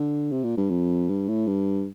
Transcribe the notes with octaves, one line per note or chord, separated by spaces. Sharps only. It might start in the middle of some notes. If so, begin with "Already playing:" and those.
Already playing: D3
C3
A#2
G2
F2
G2
A2
G2